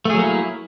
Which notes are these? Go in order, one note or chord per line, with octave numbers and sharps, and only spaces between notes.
F#3 A3 A#3 E4 G#4